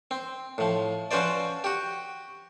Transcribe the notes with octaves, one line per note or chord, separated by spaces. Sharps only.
C4
A2 F3
F3 C#4 F#4 B4 C5 D5
F#4 G4